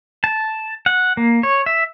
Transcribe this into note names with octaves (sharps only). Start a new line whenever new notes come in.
A5
F#5
A#3
C#5
E5